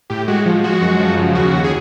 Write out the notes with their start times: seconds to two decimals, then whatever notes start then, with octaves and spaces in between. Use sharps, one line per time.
0.10 A2 G4
0.28 G#3 F#4
0.46 F3
0.64 G#3 F#4
0.82 F#2
1.00 F3
1.17 C#3
1.35 D#2 F#4
1.53 D#2
1.64 G#4